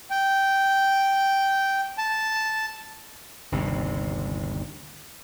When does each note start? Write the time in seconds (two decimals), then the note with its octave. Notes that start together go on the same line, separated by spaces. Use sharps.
0.10 G5
1.98 A5
3.52 G1 D#2 C3